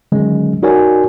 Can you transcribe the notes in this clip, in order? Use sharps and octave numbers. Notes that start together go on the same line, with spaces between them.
D3 D#3 F#3 G#3 C#4
D#4 F#4 A#4 C#5 D5 G#5